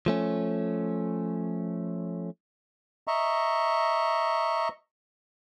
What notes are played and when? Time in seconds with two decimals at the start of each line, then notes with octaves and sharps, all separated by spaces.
0.06 F3 A3 C#4
3.07 D#5 E5 A#5 C#6